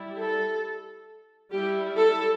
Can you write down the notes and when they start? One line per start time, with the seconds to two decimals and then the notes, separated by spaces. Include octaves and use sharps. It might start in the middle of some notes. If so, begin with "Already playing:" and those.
Already playing: G3 E4
0.19 A4
1.52 G3 E4 G4
1.97 A4